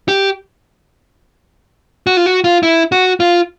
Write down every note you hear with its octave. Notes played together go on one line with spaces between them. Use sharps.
G4
F#4
F4
F#4
F4
E4
F#4
F4